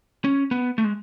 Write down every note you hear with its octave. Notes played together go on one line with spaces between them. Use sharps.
C#4
B3
A3
G#3